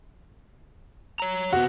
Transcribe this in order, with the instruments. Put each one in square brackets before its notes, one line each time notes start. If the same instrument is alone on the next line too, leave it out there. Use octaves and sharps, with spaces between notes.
[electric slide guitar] C#5 A#5
[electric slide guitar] C3 B3 [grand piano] F#4